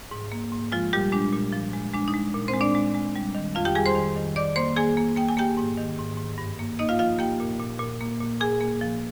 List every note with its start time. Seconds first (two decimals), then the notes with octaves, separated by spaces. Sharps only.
0.11 G#2
0.32 A#3
0.52 G#2
0.72 F3 G#3 F4
0.93 A#2 G3 G4
1.12 G#3 D4
1.33 A#2
1.53 F3
1.73 G#3
1.93 G#3 D4
2.08 D#4
2.14 G#3
2.34 A#2
2.48 C4 C5
2.54 G#3
2.61 D4 D5
2.75 G#3
2.94 G#3
3.16 G3
3.35 D#3
3.55 F2 F4 F5
3.65 G4 G5
3.75 G3 G#4 G#5
3.86 C5 C6
3.95 D#3
4.16 D#3
4.36 D#3 D5 D6
4.56 A#3 C5 C6
4.76 A#3 G#4 G#5
4.97 A#3
5.16 A#3 G5
5.29 G#5
5.37 A#3 G4 G5
5.57 G#2
5.78 D#3
5.98 G#2
6.18 G#2
6.38 G2
6.59 A#3
6.79 A#3 D#4 D#5
6.89 F4 F5
6.99 F3 F4 F5
7.19 A#3 G4 G5
7.40 A#2
7.60 A#2
7.79 A#2
8.01 A#3
8.21 A#2
8.40 A#2 G#4 G#5
8.61 A#3
8.81 F3